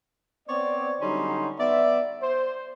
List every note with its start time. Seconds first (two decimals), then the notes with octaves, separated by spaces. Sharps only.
0.48 B3 C4 C#5 D5
1.01 D3 F#3 G3 C#4 D#4 C6
1.59 B3 D5 E5
2.22 C5